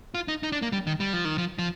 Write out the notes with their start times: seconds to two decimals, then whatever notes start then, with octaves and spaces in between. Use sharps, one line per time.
0.14 F4
0.28 D#4
0.43 D#4
0.52 D4
0.62 A#3
0.72 G3
0.87 D#3
1.00 G3
1.13 F3
1.25 D#3
1.38 F3
1.59 F3